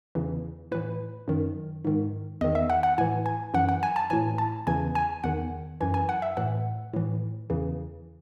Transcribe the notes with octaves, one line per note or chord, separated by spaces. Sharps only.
E2 C#3 E3
A2 E3 B4
F#2 D#3
G#2 D#3
E2 D#3 D#5
E5
F#5
F#5
A2 E3 G#5
G#5
F#2 E3 F#5
F#5
G#5
A5
A2 E3 G#5
A5
E2 C#3 E3 G#5
G#5
E2 D#3 F#5
F#2 E3 G#5
G#5
F#5
E5
A2 E3 F#5
A2 E3
E2 C#3 E3